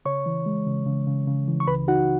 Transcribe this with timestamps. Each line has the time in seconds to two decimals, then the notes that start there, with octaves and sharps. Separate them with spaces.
0.05 C#3 C#5 C#6
0.26 E3
0.46 G#3
0.67 C#3
0.86 C#3
1.07 C#3
1.27 C#3
1.48 E3
1.60 C#6
1.67 C#2 B4 B5
1.88 D#4 F#4 F#5